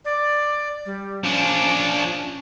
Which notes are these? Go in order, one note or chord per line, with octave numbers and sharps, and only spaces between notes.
D5
G3
F3 C#4 D4